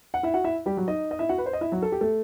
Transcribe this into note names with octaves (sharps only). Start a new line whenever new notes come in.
F#5
E4 E5
F#4 F#5
E4 E5
G3 G4
F#3 F#4
D#4 D#5
D#5
E4 E5
F#4 F#5
B4
C5
D#5
E4 E5
F#3 F#4
A4
G4
A3 A4